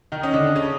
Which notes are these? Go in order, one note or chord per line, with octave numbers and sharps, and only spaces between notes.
D#3 D#4
C#4 D#5
D3 D4
D4
C#3 C#4